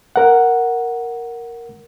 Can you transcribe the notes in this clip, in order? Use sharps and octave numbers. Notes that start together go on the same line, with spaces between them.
A#4 F#5